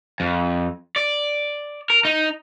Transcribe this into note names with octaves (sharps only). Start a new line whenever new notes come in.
F2
D5
A#4
D#4